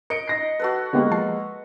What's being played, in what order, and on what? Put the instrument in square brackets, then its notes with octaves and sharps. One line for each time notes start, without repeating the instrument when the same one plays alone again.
[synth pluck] A#4 [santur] D#5 [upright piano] C#7 D7
[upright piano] D#4 A#6 C7
[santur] F#4 A4 B4
[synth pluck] D3 B3 G4 [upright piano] G#3 A#3
[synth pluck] F3 A5 C7